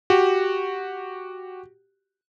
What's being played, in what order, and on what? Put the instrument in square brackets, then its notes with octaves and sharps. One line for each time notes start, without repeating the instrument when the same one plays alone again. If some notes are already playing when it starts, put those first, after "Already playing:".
[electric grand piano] F#4 G4